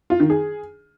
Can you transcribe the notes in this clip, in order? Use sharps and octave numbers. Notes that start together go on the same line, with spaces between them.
F4
D#3
G#4